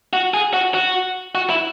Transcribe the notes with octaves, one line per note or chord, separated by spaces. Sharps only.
F#4
G#4
F#4
F#4
F#4
E4